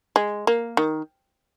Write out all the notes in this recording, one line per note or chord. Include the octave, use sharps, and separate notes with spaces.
G#3
A#3
D#3